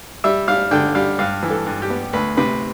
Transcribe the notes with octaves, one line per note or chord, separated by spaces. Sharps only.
G3 E5
G3 F5
D3 G5
G3 F5
G2 F5
E3
A4
G2
G4
B3
D2 B4
C3 B4